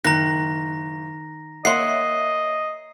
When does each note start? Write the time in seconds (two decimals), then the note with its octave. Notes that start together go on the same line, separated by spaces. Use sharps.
0.04 F#1 D#3 A#5 F#6 A#6
1.65 A#3 C#5 D#5 E5 F#5 C6 C7